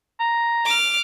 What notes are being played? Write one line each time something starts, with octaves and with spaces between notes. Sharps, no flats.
A#5
D6 F6